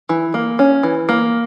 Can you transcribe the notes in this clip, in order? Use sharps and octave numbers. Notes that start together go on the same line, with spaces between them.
E3
A#3
C#4
E3
A#3